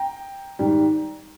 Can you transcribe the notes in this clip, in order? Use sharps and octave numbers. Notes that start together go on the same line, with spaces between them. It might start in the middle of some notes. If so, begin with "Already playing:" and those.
Already playing: G5 A#5
G#2 D#3 G3